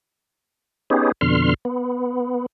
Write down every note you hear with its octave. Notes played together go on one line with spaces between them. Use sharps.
B3 C#4 D#4 G4 G#4
F2 B2 D3 C6 F6
B3